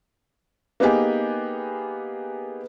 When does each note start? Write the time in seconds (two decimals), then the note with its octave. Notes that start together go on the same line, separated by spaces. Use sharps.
0.80 A#3 B3 D#4 G4 G#4